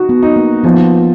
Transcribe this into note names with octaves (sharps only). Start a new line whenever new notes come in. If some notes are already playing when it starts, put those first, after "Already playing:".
Already playing: D#4 F#4
B3
D#4
A#3
F3 B3